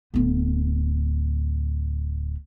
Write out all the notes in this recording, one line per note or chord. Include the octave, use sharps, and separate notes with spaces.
D1 B3